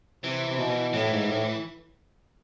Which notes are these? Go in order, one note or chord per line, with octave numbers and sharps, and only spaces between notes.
C3 E3
C3
B2
A2 E3
G#2
A2